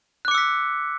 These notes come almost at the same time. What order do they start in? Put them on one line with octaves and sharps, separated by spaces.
F#6 D6 C#7 E6 B6